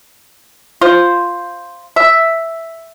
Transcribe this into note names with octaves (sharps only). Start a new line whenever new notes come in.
F4 C5
E5